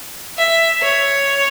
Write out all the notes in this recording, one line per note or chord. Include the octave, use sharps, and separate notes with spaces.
E5
C#5